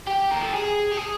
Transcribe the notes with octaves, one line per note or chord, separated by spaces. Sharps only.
G4
A#4
A4
G#4
G4
G#4